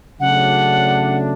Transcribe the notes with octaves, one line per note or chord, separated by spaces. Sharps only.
C#3 F#3 A3 D4 F#5